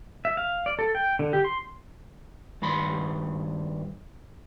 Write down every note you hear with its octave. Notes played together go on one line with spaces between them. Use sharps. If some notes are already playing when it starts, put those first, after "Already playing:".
E5
F5
D5
A4
G5
D3
G4
C6
G2 D#3 B5 C6